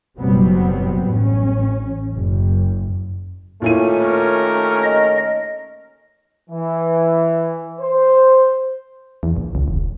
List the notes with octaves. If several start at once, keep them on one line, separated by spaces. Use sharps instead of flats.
F#1 B2 F#3 G3 B3 C4
A1 C#4
F#1 F#2
D#2 A#2 A3 C#4 E4 D#7
A#4
D#5
E3
C5
E2
A#1
C#2
E1